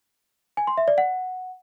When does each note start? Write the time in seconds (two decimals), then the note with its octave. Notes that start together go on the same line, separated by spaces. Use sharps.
0.57 G#5
0.67 C6
0.78 E5
0.88 D5
0.98 F#5